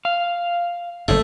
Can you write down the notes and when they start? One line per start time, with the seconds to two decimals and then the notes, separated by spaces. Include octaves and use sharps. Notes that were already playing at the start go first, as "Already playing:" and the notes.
0.05 F5
1.08 F#1 G#2 A3